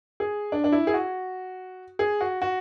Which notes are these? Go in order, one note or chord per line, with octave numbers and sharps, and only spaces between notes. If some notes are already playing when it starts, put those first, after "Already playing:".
G#4
D4
D4
E4
G#4
F#4
G#4
F#4
F#4